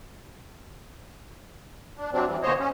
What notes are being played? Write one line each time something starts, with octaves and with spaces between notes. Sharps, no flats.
D4
C3 F#3 C4 D4
E2 E3 G3
E2 A#2 D3 C5 C#5 D#5
C#4